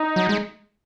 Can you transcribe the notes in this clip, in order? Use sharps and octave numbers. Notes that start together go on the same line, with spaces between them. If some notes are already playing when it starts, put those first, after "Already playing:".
Already playing: D#4
F#3
G#3